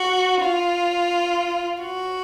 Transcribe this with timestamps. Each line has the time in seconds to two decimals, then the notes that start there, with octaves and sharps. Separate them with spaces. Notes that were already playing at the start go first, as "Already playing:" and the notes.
Already playing: F#4
0.41 F4
1.82 F#4